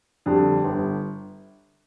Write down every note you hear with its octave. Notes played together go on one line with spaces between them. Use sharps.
F2 D3 G3
G1